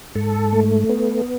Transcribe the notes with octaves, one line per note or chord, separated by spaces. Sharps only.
G#2 A4
A3
B3